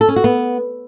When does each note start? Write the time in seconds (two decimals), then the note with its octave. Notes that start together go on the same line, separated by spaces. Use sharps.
0.01 A4
0.09 C#4
0.16 F#4
0.24 B3